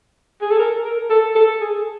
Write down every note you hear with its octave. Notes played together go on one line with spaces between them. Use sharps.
G#4
A4
A#4
A#4
A4
A4
G#4